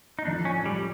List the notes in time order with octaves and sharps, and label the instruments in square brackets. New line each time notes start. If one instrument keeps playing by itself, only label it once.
[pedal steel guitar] D#4
[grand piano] A2 F3 A3 [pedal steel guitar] D4
[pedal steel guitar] C#4
G3